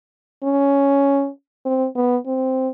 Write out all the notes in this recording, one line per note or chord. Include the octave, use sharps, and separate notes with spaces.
C#4
C4
B3
C4